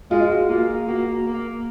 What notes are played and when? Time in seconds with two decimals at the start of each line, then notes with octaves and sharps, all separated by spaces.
0.10 G#3 F4
0.30 F#4
0.49 A#3 F4
0.88 A#3 F#4
1.26 A#3